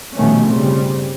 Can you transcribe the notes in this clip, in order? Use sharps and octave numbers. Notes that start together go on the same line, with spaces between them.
A#1 B2 D#3 G3 A3 C#4
G1 C#3 G3 C4